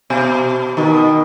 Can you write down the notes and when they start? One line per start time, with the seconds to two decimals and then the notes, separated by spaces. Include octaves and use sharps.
0.10 B2
0.77 B2 D#3